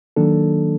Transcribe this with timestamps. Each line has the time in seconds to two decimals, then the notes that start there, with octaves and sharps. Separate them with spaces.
0.16 D#3 F#3 A#3 D4 A4